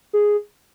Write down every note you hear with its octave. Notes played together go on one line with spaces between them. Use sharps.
G#4